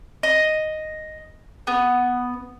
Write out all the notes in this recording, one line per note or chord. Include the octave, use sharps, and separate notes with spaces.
D#5
B3